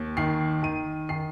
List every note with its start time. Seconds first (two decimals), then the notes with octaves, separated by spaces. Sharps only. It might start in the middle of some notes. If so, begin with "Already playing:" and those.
Already playing: D#2
0.17 D#3 C7
0.63 D#3 D#7
1.09 D#3 C7